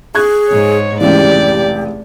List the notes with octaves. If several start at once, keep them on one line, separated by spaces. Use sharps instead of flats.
G#4 C#6 F#6 G#6
G#2 C#5
F1 C#2 E3 G4 D5